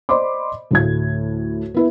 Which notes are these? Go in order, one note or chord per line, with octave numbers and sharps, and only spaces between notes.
C5 D5 D#5 B5 C6 D6
D2 A2 G#6
B3 E4 B4